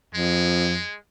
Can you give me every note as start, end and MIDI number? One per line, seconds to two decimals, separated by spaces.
0.14 0.82 41
0.14 0.96 56